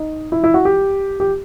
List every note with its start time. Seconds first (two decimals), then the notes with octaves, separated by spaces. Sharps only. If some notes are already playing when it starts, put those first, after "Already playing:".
Already playing: D#4
0.32 E4
0.44 E4
0.54 F#4
0.65 G4
1.20 G4